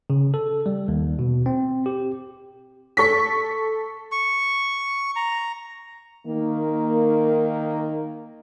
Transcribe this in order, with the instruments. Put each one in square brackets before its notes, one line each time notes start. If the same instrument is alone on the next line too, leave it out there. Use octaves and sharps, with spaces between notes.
[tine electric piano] C#3
A4
G3
D#2
B2
C4
G4
[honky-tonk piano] A4 C#6 B6
[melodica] C#6
A#5
[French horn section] D#3 A#3